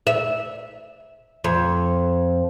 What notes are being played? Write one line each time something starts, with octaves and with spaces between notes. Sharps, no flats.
E5
F2